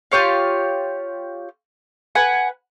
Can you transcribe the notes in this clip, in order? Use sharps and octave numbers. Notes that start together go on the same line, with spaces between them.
F4 G4 C#5 F5
B4 F#5 G#5